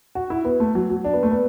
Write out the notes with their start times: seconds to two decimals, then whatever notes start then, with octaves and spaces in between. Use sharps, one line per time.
0.15 F#4
0.30 E4
0.45 B3
0.60 A3
0.75 F#3
0.90 F#3
1.04 D4
1.13 B3
1.23 A3
1.31 B3